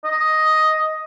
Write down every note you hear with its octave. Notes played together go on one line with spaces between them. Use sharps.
D#5